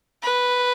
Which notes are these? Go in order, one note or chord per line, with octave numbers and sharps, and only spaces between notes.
B4